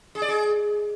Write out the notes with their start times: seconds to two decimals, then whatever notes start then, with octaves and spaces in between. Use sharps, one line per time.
0.15 G#4
0.22 D5
0.28 G#4